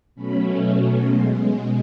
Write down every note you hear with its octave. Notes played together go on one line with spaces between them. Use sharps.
B2 F#3 A3 C#4 B5
B2 G#3 C6